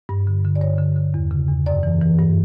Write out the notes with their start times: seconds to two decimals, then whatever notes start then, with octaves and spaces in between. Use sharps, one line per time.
0.09 G2
0.27 D3
0.45 D3
0.56 D5
0.61 G2 C#5
0.78 D3
0.96 D3
1.14 E2
1.31 C#3
1.48 E2
1.66 F#2 D5
1.83 E3
2.01 E3
2.19 G2